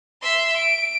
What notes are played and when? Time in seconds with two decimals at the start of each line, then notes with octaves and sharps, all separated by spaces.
0.22 E5 C6
0.56 D7